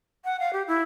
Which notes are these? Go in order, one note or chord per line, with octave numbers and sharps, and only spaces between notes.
F#5
F5
G4
E4